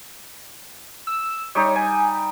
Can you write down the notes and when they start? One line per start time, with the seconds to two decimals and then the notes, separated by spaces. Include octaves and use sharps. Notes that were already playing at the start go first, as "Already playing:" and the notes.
1.07 E6
1.55 G3 D#4 C#5
1.76 G#5